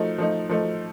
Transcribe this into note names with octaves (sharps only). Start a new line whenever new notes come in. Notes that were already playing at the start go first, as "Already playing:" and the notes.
Already playing: F3 A3 D#4
F3 A3 D#4
F3 A3 D#4